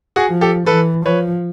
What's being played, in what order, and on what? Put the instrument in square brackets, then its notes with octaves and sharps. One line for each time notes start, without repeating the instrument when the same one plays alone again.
[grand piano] F#4 G#4
[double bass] F3
[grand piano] G4 A4
[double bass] E3 [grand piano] A4 B4
[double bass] F3 [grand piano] B4 C#5